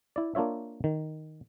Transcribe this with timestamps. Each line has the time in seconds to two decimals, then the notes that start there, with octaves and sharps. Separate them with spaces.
0.16 E4 D5
0.35 A#3 D4 F4 C#5 E5
0.84 D#3